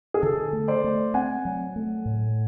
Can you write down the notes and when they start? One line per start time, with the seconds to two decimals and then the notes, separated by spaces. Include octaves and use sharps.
0.14 G#4
0.22 D3 A4
0.53 A3
0.68 C5 D5
0.84 A3
1.14 C4 F#5 G#5
1.45 F#3
1.76 A3
2.05 A2